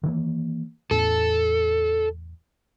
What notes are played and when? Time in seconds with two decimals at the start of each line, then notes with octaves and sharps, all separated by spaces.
0.03 D#3 E3 A#3
0.91 E2 A2 A4